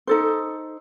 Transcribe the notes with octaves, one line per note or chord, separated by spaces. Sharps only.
D#4 A4 C5